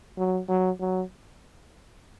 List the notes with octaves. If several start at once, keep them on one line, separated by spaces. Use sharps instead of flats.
F#3
F#3
F#3